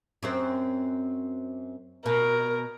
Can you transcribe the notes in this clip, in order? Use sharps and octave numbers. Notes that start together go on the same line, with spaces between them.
F#2 C4 C5
B2 A#4